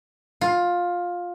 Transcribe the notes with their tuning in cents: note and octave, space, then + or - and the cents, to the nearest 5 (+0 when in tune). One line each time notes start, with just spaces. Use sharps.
F4 +15